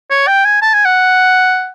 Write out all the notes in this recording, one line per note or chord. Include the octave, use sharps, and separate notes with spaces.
C#5
G5
G#5
A5
G#5
F#5